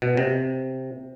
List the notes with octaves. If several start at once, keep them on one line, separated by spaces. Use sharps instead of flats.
B2
C3